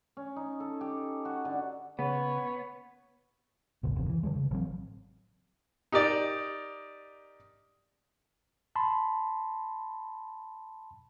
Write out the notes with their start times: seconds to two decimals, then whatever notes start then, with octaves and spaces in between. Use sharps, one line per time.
0.17 C#4
0.36 D#4
0.60 A4
0.81 G4
1.25 F#4
1.45 D3
1.99 C#3 B3 C#5 B5
3.83 G1 C#2 B2
3.96 F#1 E2 C3
4.09 E3
4.23 D3 D#3 G3 G#3
4.36 C#3
4.51 A1 F#3 C4
5.92 D#4 G4 A#4 D5
8.75 A5 B5 C6